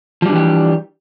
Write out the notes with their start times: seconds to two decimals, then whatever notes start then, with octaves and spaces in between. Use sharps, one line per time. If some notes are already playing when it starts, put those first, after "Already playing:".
0.22 F3
0.26 G3
0.29 D4
0.32 E3
0.36 G4